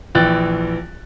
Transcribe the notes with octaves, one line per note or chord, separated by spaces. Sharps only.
A#1 E3 G5 F#6 A6